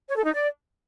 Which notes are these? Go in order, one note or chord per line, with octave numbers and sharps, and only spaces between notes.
C#5
A4
D#4
D5